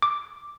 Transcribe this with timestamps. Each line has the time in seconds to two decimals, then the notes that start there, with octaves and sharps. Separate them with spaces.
0.02 D6